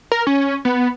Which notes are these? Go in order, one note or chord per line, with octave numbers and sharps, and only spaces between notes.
A#4
C#4
B3